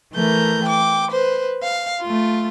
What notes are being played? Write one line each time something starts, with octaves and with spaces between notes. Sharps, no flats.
E3 A3 A#4 G6
G5 D6
B4 C5
F5
A3 F4